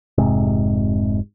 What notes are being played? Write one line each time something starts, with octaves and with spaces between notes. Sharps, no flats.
F1 G#2 C3